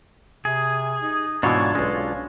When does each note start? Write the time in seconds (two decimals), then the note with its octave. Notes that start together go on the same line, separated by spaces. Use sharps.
0.45 C3 G#4
1.02 D#4
1.43 G#2 B2 E3 D4 F4 F#4 C#5
1.75 B1 G#3 C#4